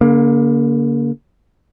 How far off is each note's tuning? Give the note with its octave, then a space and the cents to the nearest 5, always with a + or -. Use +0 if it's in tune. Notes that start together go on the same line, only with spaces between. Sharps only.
D3 -45 A#3 +15